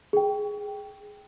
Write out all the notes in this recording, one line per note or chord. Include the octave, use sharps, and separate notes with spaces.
G#4 G5